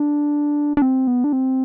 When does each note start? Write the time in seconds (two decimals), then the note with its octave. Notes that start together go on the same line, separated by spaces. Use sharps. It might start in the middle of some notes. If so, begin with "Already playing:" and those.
Already playing: D4
0.77 D4
0.82 C4
1.07 B3
1.24 D4
1.33 C4